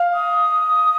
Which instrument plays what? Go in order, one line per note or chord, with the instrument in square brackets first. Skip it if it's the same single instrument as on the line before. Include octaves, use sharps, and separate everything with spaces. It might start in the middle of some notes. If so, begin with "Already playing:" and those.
Already playing: [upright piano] F5
[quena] D#6